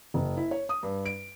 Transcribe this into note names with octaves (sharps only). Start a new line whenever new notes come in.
F#1
E4
C#5
D#6
G2
D7